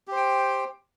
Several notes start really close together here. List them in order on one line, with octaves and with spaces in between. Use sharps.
G4 C5 G5